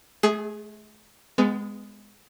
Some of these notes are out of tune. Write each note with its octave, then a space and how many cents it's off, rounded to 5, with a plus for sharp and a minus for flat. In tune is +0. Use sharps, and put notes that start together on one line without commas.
A3 -40 G#4 +0
G#3 -5 B3 +30